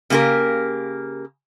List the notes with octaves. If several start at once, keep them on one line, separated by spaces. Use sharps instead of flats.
C#3 A#3 F#4 G4 A#4